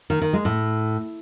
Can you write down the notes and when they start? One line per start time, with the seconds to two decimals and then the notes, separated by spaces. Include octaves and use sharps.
0.10 D#3
0.22 D#3
0.33 G#3
0.45 A2